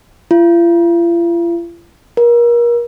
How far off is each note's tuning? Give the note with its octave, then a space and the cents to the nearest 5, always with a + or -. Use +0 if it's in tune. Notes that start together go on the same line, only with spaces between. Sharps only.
F4 -45
A#4 +30